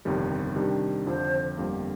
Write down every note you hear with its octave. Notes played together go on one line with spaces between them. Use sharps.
G1 F2 C3 D#3 G3
C3 D#3 G3 D4
F2 D3 F3 C5
G1 F2 D3 G3 A#3